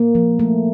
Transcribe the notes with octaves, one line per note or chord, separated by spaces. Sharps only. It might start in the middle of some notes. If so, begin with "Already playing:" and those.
Already playing: A#3
F3
A3